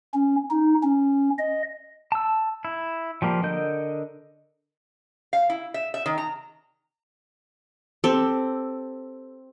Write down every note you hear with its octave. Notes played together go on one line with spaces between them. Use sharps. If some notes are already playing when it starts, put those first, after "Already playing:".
C#4
D#4
C#4
D#5
A5 E6
E4
F3 G3 A#3
D3 A#4 D#5 G6
F5
E4
E5
E5
D#3
A#5
C4 G4 A4